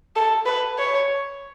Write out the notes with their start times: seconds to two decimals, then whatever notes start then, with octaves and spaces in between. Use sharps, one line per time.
0.16 A4
0.46 B4
0.79 C#5